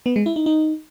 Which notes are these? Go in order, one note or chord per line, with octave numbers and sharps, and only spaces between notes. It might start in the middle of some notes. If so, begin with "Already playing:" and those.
B3
G#3
E4
D#4
D#4